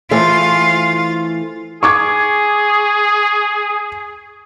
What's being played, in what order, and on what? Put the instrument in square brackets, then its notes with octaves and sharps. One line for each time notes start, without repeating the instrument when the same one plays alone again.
[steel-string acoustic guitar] E3 A3 C5 [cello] F4
[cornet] G#4 [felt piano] C#6 D6 G#6